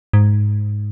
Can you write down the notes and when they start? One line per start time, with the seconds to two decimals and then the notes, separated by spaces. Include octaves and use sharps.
0.13 G#2